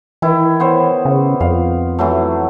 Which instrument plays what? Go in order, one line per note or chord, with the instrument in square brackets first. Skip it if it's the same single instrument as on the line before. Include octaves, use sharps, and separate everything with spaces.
[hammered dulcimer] D#3 E4 [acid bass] E3
[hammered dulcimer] B3 C5 C#5
[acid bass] C#3
[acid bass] F2 [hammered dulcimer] F5
[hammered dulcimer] E3 F#3 A3